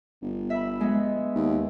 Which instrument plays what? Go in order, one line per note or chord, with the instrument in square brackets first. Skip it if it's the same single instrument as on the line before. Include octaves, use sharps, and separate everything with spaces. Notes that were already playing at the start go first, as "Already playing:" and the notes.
[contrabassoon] G1
[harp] E5 B5
G#3 B3
[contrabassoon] D#2